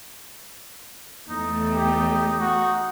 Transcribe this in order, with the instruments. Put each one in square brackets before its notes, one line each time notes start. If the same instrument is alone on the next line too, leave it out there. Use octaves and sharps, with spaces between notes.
[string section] E2 A3 [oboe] D#4
[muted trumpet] G4
F#4